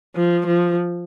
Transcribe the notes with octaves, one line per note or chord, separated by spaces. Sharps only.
F3
F3